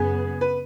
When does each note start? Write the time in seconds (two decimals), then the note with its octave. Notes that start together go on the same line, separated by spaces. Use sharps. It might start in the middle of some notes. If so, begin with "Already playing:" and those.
Already playing: F#2 C#3 B3 G#4
0.41 B4